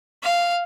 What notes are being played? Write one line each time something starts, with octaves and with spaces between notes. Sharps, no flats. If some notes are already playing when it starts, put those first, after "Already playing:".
F5